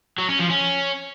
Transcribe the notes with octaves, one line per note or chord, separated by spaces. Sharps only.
F#3
C#4
F3
C#4